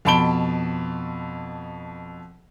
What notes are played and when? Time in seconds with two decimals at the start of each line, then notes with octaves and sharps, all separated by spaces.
0.05 F2 B2 A5 B5 D7 G7